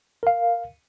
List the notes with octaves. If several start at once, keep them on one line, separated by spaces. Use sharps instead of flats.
A#4 F5